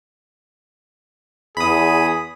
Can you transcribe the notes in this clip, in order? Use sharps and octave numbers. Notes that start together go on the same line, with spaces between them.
E2 G#4 B5 D#6